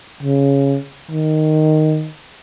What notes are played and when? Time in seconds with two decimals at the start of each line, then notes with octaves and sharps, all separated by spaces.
0.23 C#3
1.11 D#3